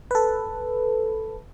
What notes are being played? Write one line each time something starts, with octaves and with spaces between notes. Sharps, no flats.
A4 B4